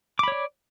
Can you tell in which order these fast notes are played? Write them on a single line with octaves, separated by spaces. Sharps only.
D6 B5 C#5 D5